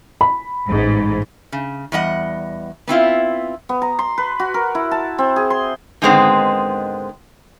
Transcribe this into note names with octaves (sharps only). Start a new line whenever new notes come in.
B5
A1 G#2
C#3
E2 G3 D#5 F#5
B3 C4 E4 F4
B3
A#5
C6
B4
F#4
A#4
E4
A5
C4
G#4
C6
G#2 D3 D#3 G#3 B3 C4